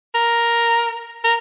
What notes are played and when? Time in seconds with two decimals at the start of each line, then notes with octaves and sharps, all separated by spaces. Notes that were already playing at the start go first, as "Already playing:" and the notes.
0.14 A#4
1.24 A#4